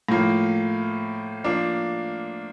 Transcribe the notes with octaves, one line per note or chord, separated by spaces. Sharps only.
A2 F3 A#3
F3 A#3 D4